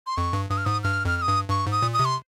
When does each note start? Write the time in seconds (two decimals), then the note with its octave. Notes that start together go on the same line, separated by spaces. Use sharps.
0.07 C6
0.17 F2 C#6
0.33 G2
0.50 G2 D#6
0.58 F6
0.65 G#2 D#6
0.83 G2 F6
1.05 F2 F6
1.17 F6
1.22 D#6
1.28 G2
1.49 G2 C#6
1.66 G#2
1.72 D#6
1.82 A#2
1.94 D#6
1.99 C3
2.05 C6